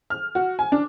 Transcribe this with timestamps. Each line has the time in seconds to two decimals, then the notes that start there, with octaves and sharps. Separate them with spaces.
0.10 F6
0.35 F#4
0.59 G#5
0.72 D4